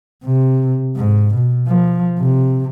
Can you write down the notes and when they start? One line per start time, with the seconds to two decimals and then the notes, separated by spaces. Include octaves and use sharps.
0.25 C3
0.97 G#2
1.35 B2
1.68 F3
2.19 C3